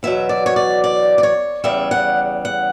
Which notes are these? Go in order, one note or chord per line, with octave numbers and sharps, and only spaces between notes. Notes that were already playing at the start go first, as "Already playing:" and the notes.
E2 B2 F#3 E5
D5
C#5
D5
D5
D5
C#5
E2 C#3 G3 E5
F#5
F#5